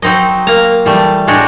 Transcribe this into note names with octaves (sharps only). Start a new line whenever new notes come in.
F#3 C4 D#4 D#5
A#3 A#5
E3 G3 A3
A2 G#3 D4 F#4 G4 A#5